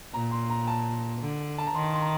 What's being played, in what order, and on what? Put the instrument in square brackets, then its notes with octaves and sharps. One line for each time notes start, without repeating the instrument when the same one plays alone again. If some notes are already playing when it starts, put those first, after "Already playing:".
[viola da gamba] A#2 [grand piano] A#5
[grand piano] C6
A#5
A5
[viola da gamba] D3
[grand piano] A5
A#5
[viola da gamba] D#3 [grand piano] C6
[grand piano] C6
A#5